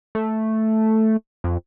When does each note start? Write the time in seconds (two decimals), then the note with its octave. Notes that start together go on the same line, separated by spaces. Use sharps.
0.15 A3
1.44 F2